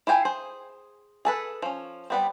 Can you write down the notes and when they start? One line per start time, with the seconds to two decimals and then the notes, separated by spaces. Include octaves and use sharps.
0.07 E4 F4 G5 G#5
0.25 G#4 C5
1.25 G#4 A4 B4
1.62 F3 C#4
2.10 G3 B3 C4